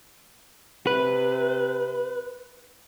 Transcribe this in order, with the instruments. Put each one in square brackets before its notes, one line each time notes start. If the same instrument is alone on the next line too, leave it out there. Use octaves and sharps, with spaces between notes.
[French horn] C3 [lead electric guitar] B4